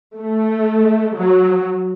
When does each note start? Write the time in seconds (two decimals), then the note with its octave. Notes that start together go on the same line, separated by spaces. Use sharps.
0.18 A3
1.17 F#3